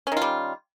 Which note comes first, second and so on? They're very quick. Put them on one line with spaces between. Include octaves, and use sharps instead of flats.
C#4 D#3 F4 G3